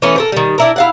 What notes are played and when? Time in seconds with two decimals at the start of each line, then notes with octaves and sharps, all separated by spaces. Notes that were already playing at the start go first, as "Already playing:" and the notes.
0.02 E3 A3 B3 C#4
0.16 A4 A#4 C5
0.32 D#3 G3
0.58 D4 E4 A#4
0.76 E4 F5 F#5